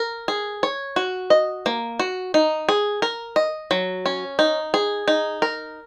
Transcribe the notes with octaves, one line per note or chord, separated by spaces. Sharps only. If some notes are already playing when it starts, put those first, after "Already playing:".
Already playing: A#4
G#4
C#5
F#4
D#5
A#3
F#4
D#4
G#4
A#4
D#5
F#3
C#4
D#4
G#4
D#4
A#4